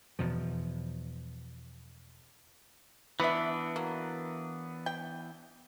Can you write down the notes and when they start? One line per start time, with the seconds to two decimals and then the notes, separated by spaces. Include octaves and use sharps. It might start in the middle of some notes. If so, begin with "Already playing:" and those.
0.19 E2 B2 F3
3.20 E3 B3 D4 B4 E5
3.76 F#3 A#3
4.86 G5